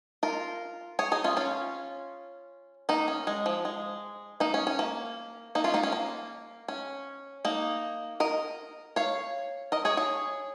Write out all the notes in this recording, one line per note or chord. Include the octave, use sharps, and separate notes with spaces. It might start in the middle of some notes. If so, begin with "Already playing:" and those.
F4 A#4
G#4 C#5
D#4 G#4
C#4 F4
C#4 F4
A#3 D#4
C#4
G#3
F3
G#3
A#3 D#4
C#4
C#4
A#3
A#3 D#4
C#4 F4
A#3 D#4
C#4
A#3
C#4
A#3 D#4
A#4 D#5
C#5 F5
A#4 D#5
G#4 C#5
G#4 C#5